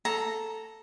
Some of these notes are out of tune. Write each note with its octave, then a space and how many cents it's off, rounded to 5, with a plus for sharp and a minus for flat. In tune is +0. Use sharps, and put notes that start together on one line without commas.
A4 +0 A#5 +0